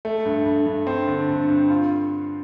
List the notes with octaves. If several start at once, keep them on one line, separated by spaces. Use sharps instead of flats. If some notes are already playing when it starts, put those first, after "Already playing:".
A3
G2
G2
G2
C4
D3
G2
G2
F4